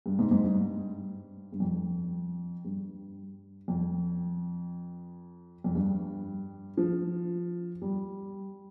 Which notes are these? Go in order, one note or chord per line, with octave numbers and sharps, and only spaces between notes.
G2
G#2
G#2
G2
G2
F2
G2
F2
F2
G2
F3
G3